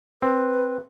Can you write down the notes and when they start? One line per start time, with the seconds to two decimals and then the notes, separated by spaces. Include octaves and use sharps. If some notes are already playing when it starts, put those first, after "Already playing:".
0.22 C4 B4